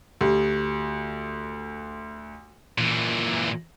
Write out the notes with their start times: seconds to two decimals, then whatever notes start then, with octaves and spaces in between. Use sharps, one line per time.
0.21 D2 G4
2.78 A#2 E3